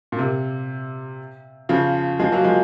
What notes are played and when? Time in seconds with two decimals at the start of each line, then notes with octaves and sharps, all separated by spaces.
0.12 A#2
0.19 C3
1.69 C#3 F3
2.20 F3 G#3
2.32 F#3 A#3
2.44 F3 G#3